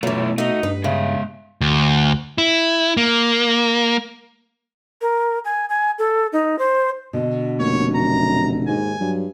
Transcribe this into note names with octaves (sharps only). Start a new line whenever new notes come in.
F#2 B2 E3 A3 F4
A3 D#4 F#4
G2 B4
C#3 G#3 E5
D2
E4
A#3
A#4
G#5
G#5
A4
D#4
C5
B2 D3
F1 A#3 C#5
F#2 A#5
D#2 G#2 G#5
G2 F#3